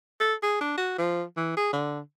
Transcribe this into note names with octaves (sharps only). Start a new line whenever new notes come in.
A4
G#4
D4
F#4
F3
E3
G#4
D3